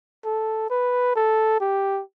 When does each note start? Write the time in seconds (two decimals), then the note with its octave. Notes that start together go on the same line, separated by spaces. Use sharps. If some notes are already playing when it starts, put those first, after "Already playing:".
0.25 A4
0.70 B4
1.16 A4
1.60 G4